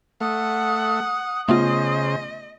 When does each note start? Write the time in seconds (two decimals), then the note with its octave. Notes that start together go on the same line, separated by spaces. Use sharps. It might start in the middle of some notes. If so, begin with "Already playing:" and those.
0.21 A3 F#5 D#6
1.49 C#3 A3 B3 F4 C5 D#5